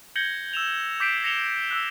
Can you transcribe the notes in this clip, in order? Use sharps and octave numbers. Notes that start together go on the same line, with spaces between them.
G6 G#6 A#6 C#7 F#7 G7
E6 E7 F7
D6 G6 B6 C7 D7 E7
A#6 C7 C#7 E7 F7 G7
E6 F#6